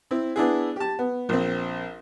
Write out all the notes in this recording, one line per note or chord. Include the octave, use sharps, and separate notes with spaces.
C4 E4
B3 D4 E4 G#4
G4 A5
B3
A#1 C4